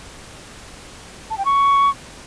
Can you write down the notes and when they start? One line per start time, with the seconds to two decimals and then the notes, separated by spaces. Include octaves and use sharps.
1.30 A5
1.38 G5
1.45 C#6